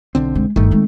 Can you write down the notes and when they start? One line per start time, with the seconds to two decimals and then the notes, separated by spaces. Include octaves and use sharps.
0.15 B1 D3 C4
0.35 G#3
0.56 G1 D#3 A3
0.71 G#3 C4